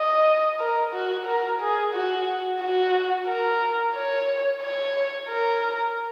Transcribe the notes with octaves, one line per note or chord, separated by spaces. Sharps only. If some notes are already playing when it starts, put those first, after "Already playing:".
Already playing: D#5
A#4
F#4
A#4
G#4
F#4
F#4
A#4
C#5
C#5
A#4